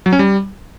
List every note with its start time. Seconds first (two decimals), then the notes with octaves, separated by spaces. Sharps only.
0.06 F#3
0.13 C#4
0.19 G3